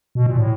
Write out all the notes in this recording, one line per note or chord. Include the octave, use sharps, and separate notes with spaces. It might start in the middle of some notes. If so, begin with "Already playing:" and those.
B2
A#2
A2